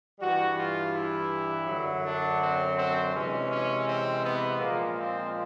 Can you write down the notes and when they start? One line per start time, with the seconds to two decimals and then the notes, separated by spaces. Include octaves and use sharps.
0.20 G2 E3 G3 F#4
0.56 F4
0.93 E4
1.66 F#2 D3 F#3
2.03 D4
2.40 C4
2.76 C4
3.13 C3 E3 G#3 C#4
3.49 C#4
3.86 C4
4.23 B3
4.59 A#2 F3 G#3 A#3
4.96 C4